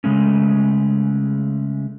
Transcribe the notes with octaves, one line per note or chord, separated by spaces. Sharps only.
C#3 G#3 A3 C#4